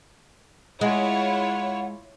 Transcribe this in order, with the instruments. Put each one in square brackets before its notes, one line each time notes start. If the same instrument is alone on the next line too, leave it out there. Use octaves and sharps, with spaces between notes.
[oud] G#3 [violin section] E4 F4 C#5 [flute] F#5